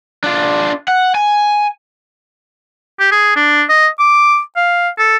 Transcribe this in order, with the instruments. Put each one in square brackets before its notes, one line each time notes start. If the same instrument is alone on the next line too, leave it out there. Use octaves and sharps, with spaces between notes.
[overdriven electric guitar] D4 F4
F#5
G#5
[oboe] G4
G#4
D4
D#5
D6
F5
A4